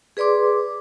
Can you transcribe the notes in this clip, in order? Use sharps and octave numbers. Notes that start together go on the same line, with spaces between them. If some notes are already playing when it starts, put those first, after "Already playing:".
G#4 B4 D5 C6 D6